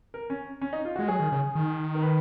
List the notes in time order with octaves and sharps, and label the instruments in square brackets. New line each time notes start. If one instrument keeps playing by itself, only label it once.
[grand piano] A#4
C#4
C#4
D#4
F4
[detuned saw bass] G#3 [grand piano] F#4
[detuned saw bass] F#3 [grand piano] G#4
[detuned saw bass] D#3
C#3
D#3
[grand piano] A#4
B4